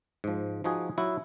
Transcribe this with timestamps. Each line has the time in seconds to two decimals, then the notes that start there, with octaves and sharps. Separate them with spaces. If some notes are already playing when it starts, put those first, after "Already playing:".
0.24 G#2 F3
0.64 F3 D#4 F#4 G#4
0.98 F#3 E4 F#4